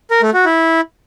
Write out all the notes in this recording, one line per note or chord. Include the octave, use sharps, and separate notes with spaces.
A#4
A3
F#4
E4